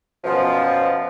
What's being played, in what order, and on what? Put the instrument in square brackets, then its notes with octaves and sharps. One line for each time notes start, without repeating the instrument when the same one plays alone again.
[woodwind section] F#2 B2 F3